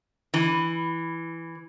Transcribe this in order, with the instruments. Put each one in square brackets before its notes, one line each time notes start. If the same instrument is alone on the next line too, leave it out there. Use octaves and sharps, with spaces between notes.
[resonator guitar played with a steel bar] E3